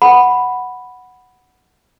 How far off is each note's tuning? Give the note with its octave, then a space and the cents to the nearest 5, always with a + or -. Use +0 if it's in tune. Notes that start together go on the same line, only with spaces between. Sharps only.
F#5 +0 B5 +0